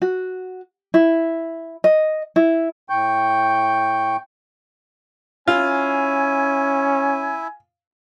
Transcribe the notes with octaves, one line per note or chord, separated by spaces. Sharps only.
F#4
E4
D#5
E4
A2 G5 C#6 G6
C#4 E4 F4 G#5